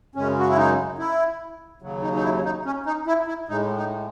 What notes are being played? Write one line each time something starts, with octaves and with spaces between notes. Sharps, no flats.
F#2 C#3 G#3 C#4
F#4
E4
D#4
E4
D#2 C#3 F#3
D#4
D#4
E4
D#4
C#4
D#4
E4
E4
A2 G#3 D#4
D#4